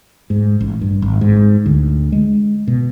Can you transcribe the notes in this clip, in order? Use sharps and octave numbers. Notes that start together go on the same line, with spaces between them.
G#2
A1
G2
G#1
G#2
D2
G#3
B2